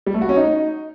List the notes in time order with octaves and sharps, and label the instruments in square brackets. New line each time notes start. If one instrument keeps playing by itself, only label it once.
[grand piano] G3
A3
F#4
C#4
D#4